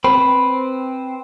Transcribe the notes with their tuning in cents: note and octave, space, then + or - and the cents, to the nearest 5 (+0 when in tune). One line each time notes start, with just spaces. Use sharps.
C4 +0 B4 +0 B5 +0